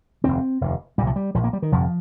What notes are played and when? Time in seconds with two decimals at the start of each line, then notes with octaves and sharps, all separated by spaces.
0.24 F1 D#2 C4
0.61 F1 D#2
0.98 A#2 G3
1.02 C2
1.07 F3
1.16 G3
1.35 A#1 A#2 F3
1.44 A#3
1.53 G3
1.62 D#3
1.72 G1 F2 C3 F3